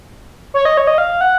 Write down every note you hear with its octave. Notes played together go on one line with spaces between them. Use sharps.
C#5
D#5
C#5
D#5
F5
F#5